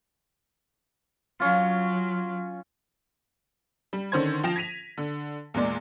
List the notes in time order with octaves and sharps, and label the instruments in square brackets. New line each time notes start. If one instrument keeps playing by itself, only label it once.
[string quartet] F#3 [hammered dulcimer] C#4 F4
[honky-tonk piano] G3
D3 D#3 C#4 C5 C6 G#6
F3 F4 G5 A#6 E7
G#6 A#6 B6 D#7 F7
D3
E2 A#2 G#3 D5